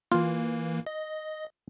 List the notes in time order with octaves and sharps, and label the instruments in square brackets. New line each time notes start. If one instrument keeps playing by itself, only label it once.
[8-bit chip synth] E3 A#3 [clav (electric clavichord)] F4
[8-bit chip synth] D#5